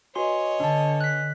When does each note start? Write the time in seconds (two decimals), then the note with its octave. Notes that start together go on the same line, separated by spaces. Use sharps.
0.16 F#4 B4 C#5 D#5 G#5 C6
0.60 D3 D4 A5
1.01 F#6 B6